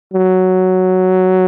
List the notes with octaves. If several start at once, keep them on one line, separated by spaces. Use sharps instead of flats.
F#3